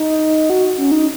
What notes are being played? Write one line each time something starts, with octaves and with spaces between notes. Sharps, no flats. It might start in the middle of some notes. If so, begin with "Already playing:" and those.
Already playing: D#4
F#4
C#4
D#4